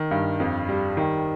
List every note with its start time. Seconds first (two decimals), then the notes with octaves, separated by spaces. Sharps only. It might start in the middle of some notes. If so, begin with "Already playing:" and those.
Already playing: D#3
0.11 G2
0.40 F2
0.69 G3
0.97 D#3